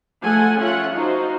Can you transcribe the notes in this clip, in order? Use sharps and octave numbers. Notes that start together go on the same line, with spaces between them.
F3 A3 A4 F#5 G#5
C#4 F4 E5 F#5
D#4 F4 F#4 C5